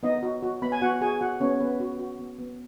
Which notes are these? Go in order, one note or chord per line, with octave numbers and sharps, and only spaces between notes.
B3 D#4 D#5
F#4
F#4
B3 B5
G#5
B3 F#4 F#5
F#4 G#4 G#5
F#4 F#5
B3 C#4 C#5
B3 B4
F#4
F#4
B3
B3